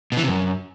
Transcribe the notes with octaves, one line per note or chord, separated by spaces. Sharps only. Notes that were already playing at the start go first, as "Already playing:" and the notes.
B2
E3
C3
F#2